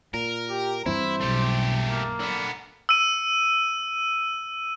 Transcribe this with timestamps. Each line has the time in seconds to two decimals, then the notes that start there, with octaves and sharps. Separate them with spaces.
0.14 A#2 A#4
0.49 G4
0.86 G2 E3 C4 E4 C5
1.21 B1 A3 G4
1.88 A#3
2.20 D3 B3
2.89 E6 D#7